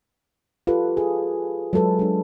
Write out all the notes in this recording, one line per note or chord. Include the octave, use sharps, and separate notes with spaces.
F4 G4 A4 B4
G#4
F#3 G#3 A4 B4
G#3 D4